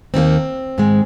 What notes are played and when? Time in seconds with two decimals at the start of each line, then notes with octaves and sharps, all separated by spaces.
0.14 D#2 D#3 G3 A#3 C4
0.78 G#2 D#3 G#3